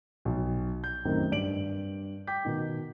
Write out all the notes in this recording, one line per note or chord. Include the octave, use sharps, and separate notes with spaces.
B1
G6
F#2 A2 D#3 C4
G2 D5 D7 F#7
G5 D6 G6 B6
B2 D#3